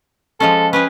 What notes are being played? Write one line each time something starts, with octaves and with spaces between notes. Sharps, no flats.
F3 G#3 C#4 A4
C#4 G4 G#4 B4